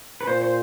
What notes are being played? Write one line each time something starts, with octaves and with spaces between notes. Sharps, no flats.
B4
A#2 C5
C5